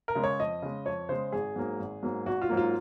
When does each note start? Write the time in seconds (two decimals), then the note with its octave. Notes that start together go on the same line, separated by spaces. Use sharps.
0.08 A#4
0.15 C#3 G#3
0.24 C#5
0.40 F2 D#5
0.62 C#3 G#3
0.86 F2 C#5
1.09 C#3 G#3 C5
1.32 G#1 G#4
1.56 G#2 F#3 A#3
1.80 G#1
2.03 G#2 F#3 A#3
2.26 G#1 F#4
2.42 F4
2.49 G#2 F#3 A#3
2.57 F4